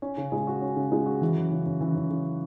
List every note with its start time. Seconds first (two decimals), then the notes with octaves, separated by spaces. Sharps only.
0.02 C#4
0.17 C#3
0.32 G#3
0.47 F#4
0.62 C#4
0.76 C#3
0.92 G#3
1.06 F#4
1.21 E3
1.36 F#2
1.51 C#3
1.66 F#2
1.81 E3
1.96 F#2
2.10 C#3